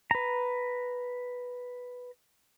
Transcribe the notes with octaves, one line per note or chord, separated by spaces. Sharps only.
B4 A#5